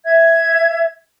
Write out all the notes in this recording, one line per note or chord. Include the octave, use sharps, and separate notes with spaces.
E5 G#6